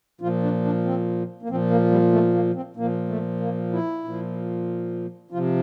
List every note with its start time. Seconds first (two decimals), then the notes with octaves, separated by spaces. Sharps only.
0.21 A#2 F3 F4
0.43 D4
0.65 D4
0.85 C4
1.42 A#3
1.49 A#2 F3 C4
1.70 A#3
1.91 G3
2.12 A3
2.34 A#3
2.55 C4
2.76 A#2 F3 A#3
3.09 A3
3.40 A#3
3.73 E4
4.04 A#2 F3
5.31 F3 F4
5.35 C3